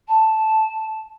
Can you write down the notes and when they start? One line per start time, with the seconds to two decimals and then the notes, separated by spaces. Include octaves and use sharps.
0.08 A5